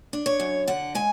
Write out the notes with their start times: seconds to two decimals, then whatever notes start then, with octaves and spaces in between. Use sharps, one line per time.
0.13 D4
0.26 C#5
0.40 F#2
0.67 D3 F#5
0.95 G#3 G#5